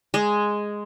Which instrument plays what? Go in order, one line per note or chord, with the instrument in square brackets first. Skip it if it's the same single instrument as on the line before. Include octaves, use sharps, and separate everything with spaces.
[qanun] G#3